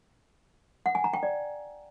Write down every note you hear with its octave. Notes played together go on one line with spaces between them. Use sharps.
F#5
G#5
A#5
G5
D5